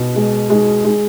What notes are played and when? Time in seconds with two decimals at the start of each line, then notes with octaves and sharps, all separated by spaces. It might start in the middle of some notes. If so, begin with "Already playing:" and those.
Already playing: B2
0.16 G#3
0.50 G#3
0.85 G#3